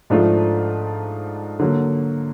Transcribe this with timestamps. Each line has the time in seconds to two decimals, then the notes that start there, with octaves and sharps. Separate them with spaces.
0.10 G#2 F3 A3 D4 F4
1.59 D3 F#3 A#3